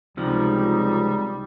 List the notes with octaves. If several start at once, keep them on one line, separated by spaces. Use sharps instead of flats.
C#2 C3 F3 G3 D#4